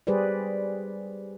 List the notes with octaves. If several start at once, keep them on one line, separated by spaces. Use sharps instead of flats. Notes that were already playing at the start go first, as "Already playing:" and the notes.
G3 G4 G#4 B4 C5 D5